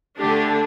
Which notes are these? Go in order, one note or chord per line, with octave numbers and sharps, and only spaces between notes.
D3 A3 D4 G4